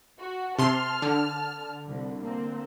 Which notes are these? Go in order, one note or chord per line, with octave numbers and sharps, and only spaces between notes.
F#4
C3 A5 C6 F6
D3
C2
A#3 C4